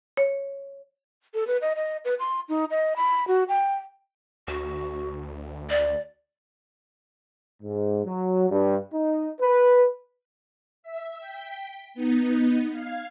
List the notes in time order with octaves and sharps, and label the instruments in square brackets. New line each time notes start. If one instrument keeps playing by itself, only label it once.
[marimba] C#5
[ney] A4
B4
D#5
D#5
B4
C6
D#4
D#5
B5
F#4
G5
[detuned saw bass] D2 [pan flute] F#4
[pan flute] D5
[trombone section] G#2
F#3
G2
D#4
B4
[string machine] E5
G5 B6
B3 D#4
F5 G#6